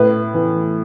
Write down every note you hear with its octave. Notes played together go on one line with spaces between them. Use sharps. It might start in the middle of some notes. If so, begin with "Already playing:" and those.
Already playing: A2 B4
E3